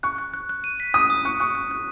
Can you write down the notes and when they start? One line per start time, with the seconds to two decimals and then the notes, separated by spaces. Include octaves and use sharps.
0.03 C#6 F#6
0.18 F#6
0.34 F#6
0.49 F#6
0.64 D#7
0.80 B6
0.94 D#6 D#7
1.10 D#6
1.25 C#6 F#6
1.40 C#6 F#6
1.55 F#6
1.71 F#6